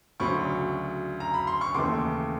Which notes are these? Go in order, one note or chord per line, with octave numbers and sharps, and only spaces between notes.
D2 C#3 F#3 B5 C#6
A#5
B5
C6
C#6
D#2 C#3 E3 A3 C6 D6